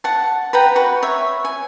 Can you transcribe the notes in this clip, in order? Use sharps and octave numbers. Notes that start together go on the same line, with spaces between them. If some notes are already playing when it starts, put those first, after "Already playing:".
F#5 A5
B4 F#5 G5 A#5
F#4 B4
C#5 E5
G#5